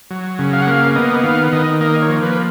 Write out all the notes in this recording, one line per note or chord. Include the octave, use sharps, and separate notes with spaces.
F#3
C#3
F5
F#5
A#3 F5
B3 D#5
D#3 F5
D#3 D#5
A#3 D#5
C#5
F3
B4